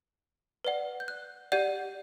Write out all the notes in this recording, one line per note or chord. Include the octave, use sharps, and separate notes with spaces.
B4 D5 F#5
G6
F#6
G4 D5 F#5 G6